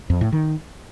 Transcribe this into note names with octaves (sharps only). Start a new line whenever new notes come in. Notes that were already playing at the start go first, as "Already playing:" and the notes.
F2
A2
D#3